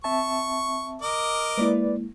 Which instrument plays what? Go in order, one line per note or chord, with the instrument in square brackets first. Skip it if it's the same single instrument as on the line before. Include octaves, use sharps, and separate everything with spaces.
[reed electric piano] C4 E5 A5 [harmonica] C#6
[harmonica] A#4 D#5 D6
[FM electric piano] G#3 A#3 E4 [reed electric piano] B4 D5